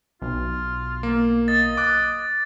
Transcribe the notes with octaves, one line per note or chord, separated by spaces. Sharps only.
B1 F4
A#3
D#5 A6
D6 F#6